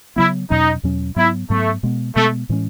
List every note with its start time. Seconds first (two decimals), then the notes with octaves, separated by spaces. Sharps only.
0.16 C#3 F#3 B3 E4
0.50 E2 B2 F#3 C#4 D#4
0.83 E2 B2 F#3 C#4
1.16 G#2 F#3 B3 E4
1.50 G#2 F#3 A3 B3
1.83 B2 G#3 B3
2.16 B2 G#3 A3 B3
2.49 A2 E3 G#3 C#4